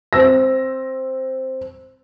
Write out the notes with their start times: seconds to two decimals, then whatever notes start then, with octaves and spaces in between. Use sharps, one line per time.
0.13 C4 E6 A#6